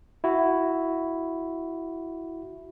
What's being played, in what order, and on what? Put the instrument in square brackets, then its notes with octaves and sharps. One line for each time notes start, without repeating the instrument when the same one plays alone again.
[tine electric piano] E4 F#4